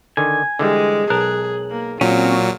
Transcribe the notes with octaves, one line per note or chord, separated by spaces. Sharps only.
D3 D#3 G#5
D3 E3 G3 G#3
B1 G#4 A#4 A5 F#6
A#3
A#2 F#3 C4 C#4 F4